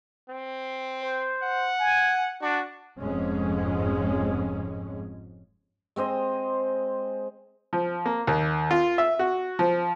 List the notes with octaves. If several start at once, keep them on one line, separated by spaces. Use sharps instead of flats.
C4
C5
F#5
G#5
D4 F#4
F1 F2 G#2 G#3 C#4
G#3 C4 C5 D#5
F3
A#3
D#2
F4
E5
F#4
F3